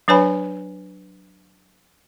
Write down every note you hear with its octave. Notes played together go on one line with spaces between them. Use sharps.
F#3 D4 B4 C#5 G#5 B5